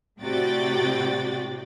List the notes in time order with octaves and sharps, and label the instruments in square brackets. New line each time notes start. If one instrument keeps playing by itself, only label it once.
[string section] A2 C3 F#4 D5 G5 A6